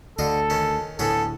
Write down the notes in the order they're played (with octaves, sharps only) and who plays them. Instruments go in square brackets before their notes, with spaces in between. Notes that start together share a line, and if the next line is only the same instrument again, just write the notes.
[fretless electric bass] D2 [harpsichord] D3 D#5 F5 [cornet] A4
[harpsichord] D#3 C#4
[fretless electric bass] D2 A2 [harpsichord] B3 C#4 G#4 [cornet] A4